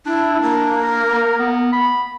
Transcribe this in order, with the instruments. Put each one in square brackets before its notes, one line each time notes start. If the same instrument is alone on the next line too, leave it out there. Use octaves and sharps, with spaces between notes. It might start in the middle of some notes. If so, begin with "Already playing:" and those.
[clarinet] D4 [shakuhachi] E4
[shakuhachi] A#3
[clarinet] A#4
B3
B5